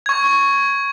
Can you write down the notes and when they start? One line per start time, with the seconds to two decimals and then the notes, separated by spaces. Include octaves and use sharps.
0.06 C#6 G#6